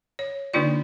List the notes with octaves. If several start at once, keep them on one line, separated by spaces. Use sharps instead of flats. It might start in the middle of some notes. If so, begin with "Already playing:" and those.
C#5
D3 A#3 D4 D#4 F4 D5